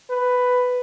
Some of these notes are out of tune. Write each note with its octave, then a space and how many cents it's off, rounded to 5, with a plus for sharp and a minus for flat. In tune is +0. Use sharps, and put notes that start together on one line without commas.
B4 +10